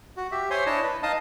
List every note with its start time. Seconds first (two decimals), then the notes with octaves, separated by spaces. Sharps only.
0.17 F#4
0.32 G4 E5
0.51 C5 C#5 E5 G#5 C6
0.66 D4 E4 C#5 D#5 A5
0.83 B4
1.03 D#4 D#5 F5 A5 D#6